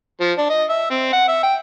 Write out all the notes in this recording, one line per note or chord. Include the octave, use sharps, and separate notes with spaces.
F3
D4
D#5
E5
C4
F#5
E5
G5